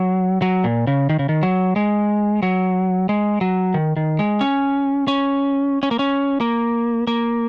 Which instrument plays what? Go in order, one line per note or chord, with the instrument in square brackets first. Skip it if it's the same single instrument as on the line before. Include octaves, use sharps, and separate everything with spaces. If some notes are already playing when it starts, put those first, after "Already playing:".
Already playing: [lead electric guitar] F#3
F#3
A#2
C#3
D#3
C#3
D#3
F#3
G#3
F#3
G#3
F#3
D#3
D#3
G#3
C#4
C#4
C#4
A#3
C#4
A#3
A#3